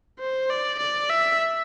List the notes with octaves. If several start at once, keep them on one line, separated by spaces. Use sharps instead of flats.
C5
D5
D5
E5